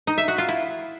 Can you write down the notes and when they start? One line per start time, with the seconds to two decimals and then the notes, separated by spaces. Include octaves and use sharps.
0.07 D#4
0.18 E5
0.28 F#4
0.38 F4
0.49 E4